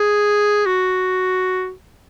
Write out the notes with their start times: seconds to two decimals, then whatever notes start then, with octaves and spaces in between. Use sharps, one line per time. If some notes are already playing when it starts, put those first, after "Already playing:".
Already playing: G#4
0.66 F#4